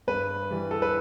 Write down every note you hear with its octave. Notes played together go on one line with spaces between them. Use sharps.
G2 B4
E3 G3
A4
B4